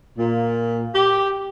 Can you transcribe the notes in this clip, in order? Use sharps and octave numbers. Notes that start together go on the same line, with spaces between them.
A#2
G4